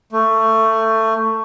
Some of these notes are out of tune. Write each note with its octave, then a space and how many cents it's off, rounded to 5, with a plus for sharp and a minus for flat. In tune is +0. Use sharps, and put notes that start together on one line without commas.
A3 +20